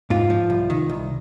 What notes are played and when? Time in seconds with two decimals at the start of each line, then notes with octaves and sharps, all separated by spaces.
0.10 G#2 F4
0.30 F3
0.50 C2
0.70 D#3
0.90 C2